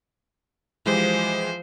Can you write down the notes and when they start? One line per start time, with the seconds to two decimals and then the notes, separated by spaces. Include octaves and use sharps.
0.86 E3 F3 G#3 G4 C5